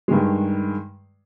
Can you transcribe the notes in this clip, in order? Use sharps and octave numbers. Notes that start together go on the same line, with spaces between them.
G2 D#3 G#3